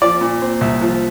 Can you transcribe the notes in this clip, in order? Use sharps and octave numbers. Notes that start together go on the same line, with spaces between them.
F3 D5
A#2
C4
C2
F3